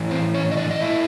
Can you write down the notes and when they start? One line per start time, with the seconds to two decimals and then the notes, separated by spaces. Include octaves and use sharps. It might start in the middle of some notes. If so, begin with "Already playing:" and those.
Already playing: A2 E3
0.11 C4 C5
0.34 C#4 C#5
0.51 D#5
0.57 D4 D5
0.71 D#5
0.81 A#2 E4 E5